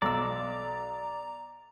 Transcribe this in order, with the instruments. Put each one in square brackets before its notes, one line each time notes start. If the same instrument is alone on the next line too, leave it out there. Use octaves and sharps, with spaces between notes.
[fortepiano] B1 C6 E6 [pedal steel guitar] D5 [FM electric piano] A#5